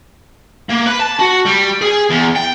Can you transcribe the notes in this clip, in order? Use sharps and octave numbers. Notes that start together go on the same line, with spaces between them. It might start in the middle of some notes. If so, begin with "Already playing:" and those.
A#3
B4
A5
F#4
G3
G#4
E2
G5